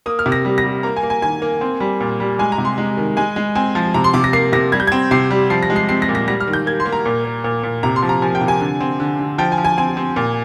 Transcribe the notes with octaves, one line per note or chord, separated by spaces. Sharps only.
A#3 D#6
F6
C3
A#6
G3
A#6
G3
A#3 A#5
G#5
A#3
G#5
D#3 G#5
A#3
C4
G3
A#2
G3
G#3 G#5
A#5
C3
C6
G#3
D#3
G#3 G#5
G#3
C4 G#5
F3
C3 A#5
C6
C3 D6
A#6
A#3 C7
C3 A#6
G3 G#6
G6
C4 G#6
C3 C7
G3
F3 C7
A#6
G#3
C7
C4 C7
A#6
A#2
A#6
G3 A#6
F6
D#3
G6
A#3 G#6
C6
A#3
A#5
A#2
A#3
A#2
A#2
C3 A#5
C6
F3
A#5
F3 G#5
G5
C3
G#5
D3
C4
D3
D3
F3 G5
G#5
F3
G#5
C4 G#5
C4
A#2